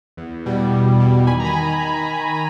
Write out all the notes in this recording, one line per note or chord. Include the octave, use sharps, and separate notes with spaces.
E2
B2 G3
E2
B2 G3
D#3 G#5 B5
A#5
G#5 B5